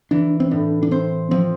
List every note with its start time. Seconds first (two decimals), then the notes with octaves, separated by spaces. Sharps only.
0.11 E3 D4
0.40 C4
0.51 A2 D4
0.83 D4
0.91 C4 C5
1.31 F3 C4